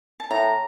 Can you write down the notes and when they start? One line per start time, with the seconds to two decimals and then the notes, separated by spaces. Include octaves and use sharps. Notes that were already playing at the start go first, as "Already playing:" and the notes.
0.20 A5
0.30 A2 A#5